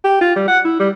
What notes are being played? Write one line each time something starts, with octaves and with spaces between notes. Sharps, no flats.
G4
F4
G3
F#5
E4
G3